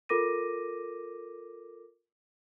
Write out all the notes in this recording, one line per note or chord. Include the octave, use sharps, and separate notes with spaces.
F4 A4 A#4 D6 A#6 D#7